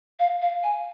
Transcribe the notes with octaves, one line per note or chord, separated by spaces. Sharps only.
F5
F5
G#5